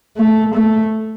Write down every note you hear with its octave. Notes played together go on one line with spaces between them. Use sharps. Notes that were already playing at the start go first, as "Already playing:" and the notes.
A3
A3